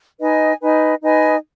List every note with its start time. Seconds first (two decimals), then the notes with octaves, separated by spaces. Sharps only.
0.19 D#4 B4 D#5 G#5
0.61 D#4 B4 D#5 G#5
1.03 D#4 B4 D#5 G#5